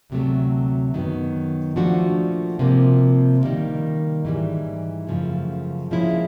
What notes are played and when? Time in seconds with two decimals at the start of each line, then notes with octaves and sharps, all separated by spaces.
0.10 D2 C3 D#3 F#3 A3
0.94 F#2 D#3 F#3 B3
1.76 A#2 F3 A3 D4 F#4
2.59 C3 F3 A#3
3.41 D#3 G3 A#3
4.25 G#2 E3 G3
5.07 F#2 C#3 F3 A3
5.91 A#2 F3 G#3 C#4 E4